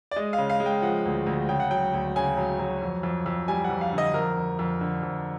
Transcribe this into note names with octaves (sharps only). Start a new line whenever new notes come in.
D5
G#3 D#5
F5
C#3
F5
G#3
G5
F3 F#5
D2
D2
C#3 G5
F#5
F#3 G5
D2
C#3 G#5
F#3
F#3
F2
F2
F2
G3 G#5
F#5
F2
F5
D3
D#5
F2 A#4
F2
F2
D3
F2